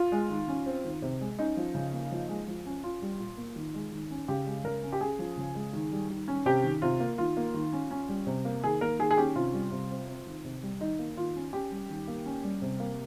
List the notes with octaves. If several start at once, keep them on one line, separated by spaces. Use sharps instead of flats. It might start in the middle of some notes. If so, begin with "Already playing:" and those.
Already playing: F4
G#3
D#3
C#4
C4
D#3
C3
G#3
C#4 D#4
F3
C#3
A#3
F3
G#3
F3
C#4
C#4 F4
G3
A#2
A#3
D#3
G#3
D#3
C#4
C#3 G4
G#3
C#3 A#4
C#4
G4
C#4 G#4
F3
C#3
G#3
D#3
G3
D#3
C#4
C3 G4
D#3
C3 F4
A#3
D#3 F4
A#3
D#3
C#4
C#4
G3
C3
A#3
D#3 G#4
A#3 A#4
D#3 G#4
G#4
C#4 G4
C3 F4
G3
C3
C4
C4
D#3
C3
G3
D#3 D#4
A#3
D#3 F4
C#4
C#4 G4
G3
D#3
A#3
C#4
G3
C3
A#3